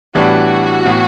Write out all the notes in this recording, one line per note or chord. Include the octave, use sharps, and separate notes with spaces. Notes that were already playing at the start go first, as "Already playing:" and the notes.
A2 E3 G3 B3 D4 F#4
A2 E3 B3